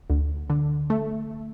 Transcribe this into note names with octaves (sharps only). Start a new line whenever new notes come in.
D2
D3
A3